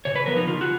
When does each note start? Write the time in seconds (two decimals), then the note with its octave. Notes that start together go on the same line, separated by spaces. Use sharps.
0.05 C#3 C#5
0.16 B4
0.26 F3 B3 A#4
0.37 D#4
0.47 C#3 F4
0.61 F#4